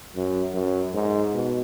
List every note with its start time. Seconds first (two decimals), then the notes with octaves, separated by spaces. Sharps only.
0.16 F#2
0.54 F#2
0.94 G#2
1.34 B2